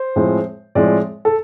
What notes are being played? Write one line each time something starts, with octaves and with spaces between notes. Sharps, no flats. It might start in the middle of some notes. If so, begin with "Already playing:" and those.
Already playing: C5
A2 F3 G#3 C4
A2 F3 G#3 C4 D5
A4